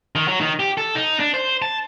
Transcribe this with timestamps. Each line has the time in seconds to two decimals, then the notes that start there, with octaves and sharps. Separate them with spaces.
0.15 D#3
0.28 F#3
0.41 D#3
0.60 G4
0.78 A4
0.95 D#4
1.20 D4
1.34 C5
1.62 A5